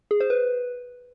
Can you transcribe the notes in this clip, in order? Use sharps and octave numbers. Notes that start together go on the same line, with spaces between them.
G#4
C5
B4